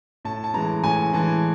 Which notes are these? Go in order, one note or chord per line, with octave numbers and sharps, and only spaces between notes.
A2 A5
A5
E3 G#3 A#5
A2 G#5
E3 G#3 A5